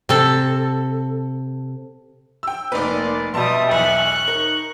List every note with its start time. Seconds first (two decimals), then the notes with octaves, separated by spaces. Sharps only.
0.09 C3 A4
2.43 G5 E6
2.72 F1 A#3 D#4 B4 C5 D5
3.34 B2 G3 E5 A5 C6 D#6
3.71 B1 E2 C#6 F#6
4.28 D#4 A#4